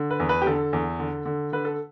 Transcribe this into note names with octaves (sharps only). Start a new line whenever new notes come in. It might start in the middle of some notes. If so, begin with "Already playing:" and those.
Already playing: D3
B4
E2
B4
G4
D3 A4
E2
D3
D3
D3 B4
A4